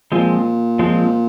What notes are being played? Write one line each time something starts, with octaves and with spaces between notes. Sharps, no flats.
A#2 F3 G#3 C4
F3 G#3 C4